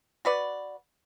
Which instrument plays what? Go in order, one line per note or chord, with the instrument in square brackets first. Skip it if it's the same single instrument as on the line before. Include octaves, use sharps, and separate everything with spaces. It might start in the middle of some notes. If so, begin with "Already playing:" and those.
[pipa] F#4 B4 D5